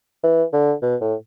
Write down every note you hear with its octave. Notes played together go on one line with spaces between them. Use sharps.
E3
D3
B2
A2